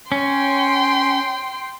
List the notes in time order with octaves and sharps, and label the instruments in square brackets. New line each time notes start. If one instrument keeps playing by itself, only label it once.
[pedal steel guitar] C#4 [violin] G5 C6